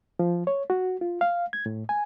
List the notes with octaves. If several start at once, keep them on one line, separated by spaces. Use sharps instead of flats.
F3
C#5
F#4
F4
F5
G#6
A2
G#5